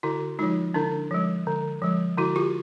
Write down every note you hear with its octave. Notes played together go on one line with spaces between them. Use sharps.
D3 E4 F#4
F3 G#3 D#4 F4
D3 D4 E4
F3 G#3
D3
F3 G#3
D3 E4 F#4
F4 G4